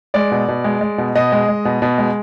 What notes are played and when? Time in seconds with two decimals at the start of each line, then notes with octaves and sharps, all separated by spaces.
0.14 G#3 D5
0.32 B2
0.48 B2
0.64 G#3
0.81 G#3
0.98 B2
1.15 B2 D#5
1.32 G#3
1.49 G#3
1.65 B2
1.82 B2
1.98 G#3